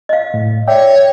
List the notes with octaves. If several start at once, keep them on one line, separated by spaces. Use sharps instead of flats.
D#5 F5
A2
C#5 D5 E5 G5